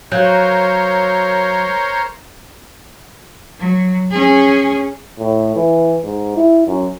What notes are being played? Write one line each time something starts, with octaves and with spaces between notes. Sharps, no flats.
F#3 F#4 A#4 C5 C#5 F5 G6
F#3
C#4 G#4
A2
E3
G#2
E4
F#2